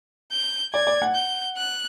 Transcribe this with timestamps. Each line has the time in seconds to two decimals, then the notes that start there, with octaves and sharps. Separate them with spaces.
0.32 G6
0.74 D5 G#6
0.87 D5
1.02 F#5
1.15 G6
1.57 F#6